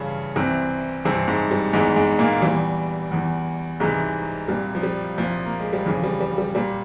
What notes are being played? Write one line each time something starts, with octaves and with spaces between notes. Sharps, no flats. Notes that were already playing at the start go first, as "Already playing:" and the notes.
Already playing: G2 C#3 E3 C#4
C2 C3 E3 C4
G2 C3 E3 C4
G#2 G#3
G3
E2 G#2 E3 G#3
G#2 G#3
A#2 A#3
E2 E3 G3
E2 E3
C2 G#2 C3 E3 G#3
C2 A#2 G3
F3
G3
C2 A#2 F3
A#3
G#3
G3
F2 C#3 E3 F3
G3
G3
G3
A#2 G3